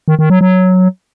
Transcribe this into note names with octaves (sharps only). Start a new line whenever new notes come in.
D#3
D#3
F#3
F#3